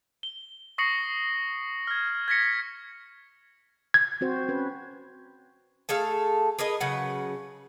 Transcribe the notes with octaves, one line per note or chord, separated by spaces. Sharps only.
G7
C#6 D#6 A#6 C7 C#7 F#7
F6 G#6
G#6 A#6 B6 C#7
G#6
C4 F#4 C5
C#4 B4
A3 G#4 A4 F5
G#4 A#4 B4 D#5
C#3 F#3 B4 F#5